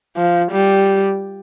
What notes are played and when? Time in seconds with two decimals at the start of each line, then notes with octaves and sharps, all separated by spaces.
0.17 F3
0.52 G3